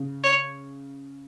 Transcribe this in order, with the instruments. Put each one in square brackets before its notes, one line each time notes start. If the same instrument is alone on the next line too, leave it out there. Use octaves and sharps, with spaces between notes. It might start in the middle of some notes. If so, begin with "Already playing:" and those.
Already playing: [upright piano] C#3
[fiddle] C#5